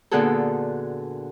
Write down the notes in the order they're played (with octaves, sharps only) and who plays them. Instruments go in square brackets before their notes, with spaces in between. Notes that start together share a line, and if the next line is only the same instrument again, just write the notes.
[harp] A#2 D3 B3 F#4 G#4 A4